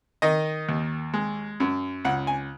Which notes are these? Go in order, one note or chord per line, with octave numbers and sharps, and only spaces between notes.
D#3 D#5
D#2
G#3
F#2
C#2 F#5
G#5